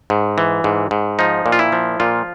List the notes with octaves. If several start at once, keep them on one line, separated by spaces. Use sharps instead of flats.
G#2
E3
G#2
G#2
F3 D#4
A#2
F4
E4
F3
A#2 F4